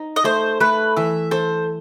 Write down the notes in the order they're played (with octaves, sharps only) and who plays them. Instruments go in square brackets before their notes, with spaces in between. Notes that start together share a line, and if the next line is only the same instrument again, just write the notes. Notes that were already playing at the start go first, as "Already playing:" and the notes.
Already playing: [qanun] D#4
[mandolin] D#5
[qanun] A3 [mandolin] C5
[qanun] A3 [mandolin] B4
[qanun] E3 [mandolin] E5
[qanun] A4 [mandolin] C5